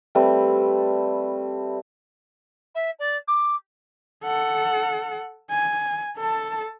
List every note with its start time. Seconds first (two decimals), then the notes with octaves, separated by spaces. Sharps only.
0.15 G3 A3 C4 B4
2.75 E5
2.99 D5
3.28 D6
4.24 A4 F#5
5.50 G#5
6.18 A4 A5